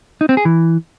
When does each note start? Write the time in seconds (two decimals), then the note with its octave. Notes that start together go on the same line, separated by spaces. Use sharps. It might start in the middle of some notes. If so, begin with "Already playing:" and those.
0.21 D#4
0.29 C4
0.37 G#4
0.45 E3